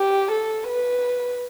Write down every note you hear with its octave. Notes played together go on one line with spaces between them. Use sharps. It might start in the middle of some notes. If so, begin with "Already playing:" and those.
Already playing: G4
A4
B4